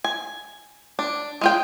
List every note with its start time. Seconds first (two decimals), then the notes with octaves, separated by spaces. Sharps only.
0.04 G#5
0.99 D4
1.41 G#3 F4 G5